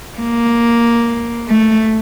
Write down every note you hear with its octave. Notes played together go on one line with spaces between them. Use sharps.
A#3
A3